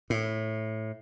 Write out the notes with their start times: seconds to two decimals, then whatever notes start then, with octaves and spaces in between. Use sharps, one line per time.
0.10 A2